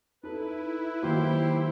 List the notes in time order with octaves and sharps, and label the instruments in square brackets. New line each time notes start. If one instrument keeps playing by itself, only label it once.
[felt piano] D#4 A4 [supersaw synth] E4 [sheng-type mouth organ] B4
[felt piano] D#3 F#3 A#3 [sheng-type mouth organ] G4 C5